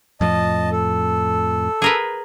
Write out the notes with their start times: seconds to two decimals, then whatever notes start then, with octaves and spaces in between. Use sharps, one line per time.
0.21 F2 A2 F3 D#5 A5
0.72 A4
1.82 G#4 A#4 B4